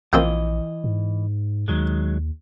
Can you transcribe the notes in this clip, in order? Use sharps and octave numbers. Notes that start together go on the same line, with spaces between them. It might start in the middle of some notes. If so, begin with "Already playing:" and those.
A#1 E3 F3 A#3 C4 D#5
G#2
D#2 D#3 F#3 G#3